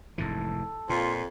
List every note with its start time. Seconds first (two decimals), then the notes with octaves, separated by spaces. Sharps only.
0.18 F1 G#2 E3 A4
0.90 F2 A#2 F4